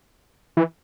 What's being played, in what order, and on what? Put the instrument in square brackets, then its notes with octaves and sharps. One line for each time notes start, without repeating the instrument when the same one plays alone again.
[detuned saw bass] E3